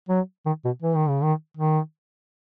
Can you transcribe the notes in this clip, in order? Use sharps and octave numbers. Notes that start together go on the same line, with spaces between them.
F#3
D#3
B2
E3
D#3
C#3
D#3
D#3